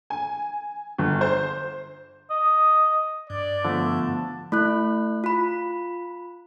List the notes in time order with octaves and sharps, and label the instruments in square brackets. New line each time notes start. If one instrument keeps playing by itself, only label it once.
[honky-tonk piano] G#5
G1
C5
[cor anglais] D#5
[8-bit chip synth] G2 [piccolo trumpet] D5
[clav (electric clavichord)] D3 A3 [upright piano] F3 B3 [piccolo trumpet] A5
[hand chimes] A3 E4 F#6
F4 B5